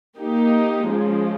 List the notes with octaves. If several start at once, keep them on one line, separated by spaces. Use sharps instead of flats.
A#3 D#4 G4
C#3 F3 G#3